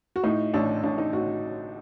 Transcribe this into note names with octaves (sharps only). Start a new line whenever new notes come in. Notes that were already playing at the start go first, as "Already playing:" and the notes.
F#4
A2 D#4
A1 D4
A1 D4
D#4
A1 F#4